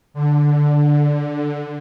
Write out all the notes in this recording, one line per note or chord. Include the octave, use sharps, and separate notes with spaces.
D3